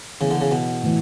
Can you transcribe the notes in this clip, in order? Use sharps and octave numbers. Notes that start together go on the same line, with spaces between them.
C#3 E3 B3 E4
D3
C#3
B2
A2 E3